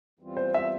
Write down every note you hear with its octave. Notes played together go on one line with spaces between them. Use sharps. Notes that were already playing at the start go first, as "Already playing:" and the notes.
E2 E3 G3 C4 F4
C5
E5